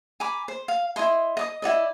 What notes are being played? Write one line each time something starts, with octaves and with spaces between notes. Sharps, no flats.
G#5 A#5 B5 D6
C5
F5
E4 A4 D#5 C6
D#5 D6 D#6
E4 F#4 D5 D#5